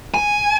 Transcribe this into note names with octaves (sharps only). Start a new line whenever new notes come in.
G#5